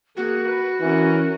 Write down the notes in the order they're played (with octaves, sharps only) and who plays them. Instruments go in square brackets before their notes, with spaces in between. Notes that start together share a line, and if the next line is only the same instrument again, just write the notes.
[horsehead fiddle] A#3 G#4 [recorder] F#4
[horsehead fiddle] B4
[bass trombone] E3 [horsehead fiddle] C#4 A#4